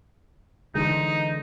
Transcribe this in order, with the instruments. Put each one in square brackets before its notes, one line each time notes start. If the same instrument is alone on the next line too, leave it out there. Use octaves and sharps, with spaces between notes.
[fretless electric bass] D3 E3 G#3 [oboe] D#4